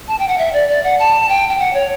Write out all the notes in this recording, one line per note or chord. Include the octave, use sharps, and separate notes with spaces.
A5
G5
F#5
E5
D5
D5
F#5
A5
G5
G5
F#5
C#5